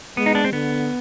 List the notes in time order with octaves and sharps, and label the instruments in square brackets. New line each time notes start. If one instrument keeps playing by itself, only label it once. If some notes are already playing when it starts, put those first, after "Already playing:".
[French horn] G#3 [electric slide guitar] B3
[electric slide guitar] D#4
D4
C4
[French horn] D3 [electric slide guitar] B3